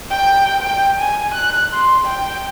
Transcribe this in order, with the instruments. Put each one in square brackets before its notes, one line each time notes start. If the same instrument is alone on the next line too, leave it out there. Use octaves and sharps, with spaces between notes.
[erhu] G5
G5
G#5
F#6
C6
G5